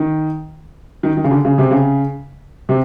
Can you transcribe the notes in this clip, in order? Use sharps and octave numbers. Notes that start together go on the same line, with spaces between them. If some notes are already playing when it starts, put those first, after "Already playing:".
Already playing: D#3
D#3
D#3
C#3
D3
C#3
C3
C#3
C3